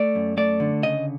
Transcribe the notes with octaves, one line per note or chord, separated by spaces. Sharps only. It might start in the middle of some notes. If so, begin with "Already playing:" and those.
Already playing: A3 D5
F#2
A3 D5
D3
C#3 D#5